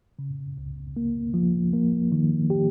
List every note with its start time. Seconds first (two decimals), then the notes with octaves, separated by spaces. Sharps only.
0.19 C#3
0.58 C#2
0.97 A#3
1.34 F3
1.73 A#3
2.12 D#3
2.50 G4